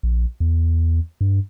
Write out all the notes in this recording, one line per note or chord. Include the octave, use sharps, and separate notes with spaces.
A#1
E2
G2